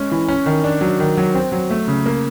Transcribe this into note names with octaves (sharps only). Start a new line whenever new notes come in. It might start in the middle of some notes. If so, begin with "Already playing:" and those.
Already playing: G#3 C#4
E3
C#4
D#3
D4
F#3
D#3
F#3
C4
F#3
A3
C#3
A#3